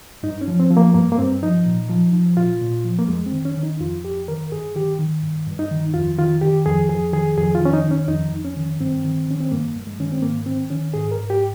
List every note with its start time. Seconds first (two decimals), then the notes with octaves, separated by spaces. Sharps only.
0.23 G2 D#4
0.41 C#4
0.48 F3
0.60 C4
0.71 F3
0.77 A#3
0.94 G2 A#3
1.12 A#3
1.18 G2 C4
1.42 F3 D#4
1.65 A#2
1.90 F3
2.13 F3
2.37 A#2 F4
2.61 A#2
2.84 F3
2.99 A#3
3.08 F2 G#3
3.26 C4
3.32 D#3
3.45 C#4
3.57 D#3
3.63 D#4
3.81 F2 F4
4.05 F2 G4
4.28 D#3 A#4
4.51 G2 G#4
4.75 D#3 G4
4.99 D#3
5.23 G2
5.47 G2
5.59 D#4
5.71 D#3
5.94 F2 F4
6.18 D#3 F4
6.41 D#3 G4
6.66 F2 G#4
6.89 F2 G#4
7.13 D#3 G#4
7.37 F2 G#4
7.55 F4
7.60 D#3
7.65 C#4
7.73 D#4
7.84 D#3
7.91 C#4
8.08 F2 D#4
8.32 F2
8.45 C#4
8.57 D#3
8.80 G2 C4
9.04 D#3
9.28 D#3 C#4
9.41 C4
9.52 G2 A#3
9.75 G2
9.87 G#3
9.99 D#3 C#4
10.12 C4
10.22 G#2 A#3
10.46 D#3 C4
10.70 D#3 C#4
10.94 G#2 G#4
11.11 A#4
11.18 G#2
11.30 G4